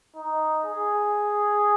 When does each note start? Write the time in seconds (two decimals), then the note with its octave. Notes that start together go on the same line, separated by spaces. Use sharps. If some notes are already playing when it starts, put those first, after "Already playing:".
0.16 D#4
0.65 G#4